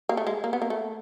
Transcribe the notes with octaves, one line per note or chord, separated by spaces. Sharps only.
A#3
A3
G#3
A#3
B3
A#3
A3